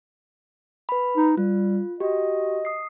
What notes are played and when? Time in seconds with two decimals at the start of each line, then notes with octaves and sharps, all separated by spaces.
0.89 B4 B5
1.17 D#4
1.38 G3 F4
2.00 F#4 G4 D#5
2.65 D#6 C7